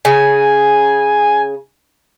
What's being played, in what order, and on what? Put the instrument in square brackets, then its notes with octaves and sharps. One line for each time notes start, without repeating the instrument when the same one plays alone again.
[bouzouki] C#3 [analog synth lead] G#5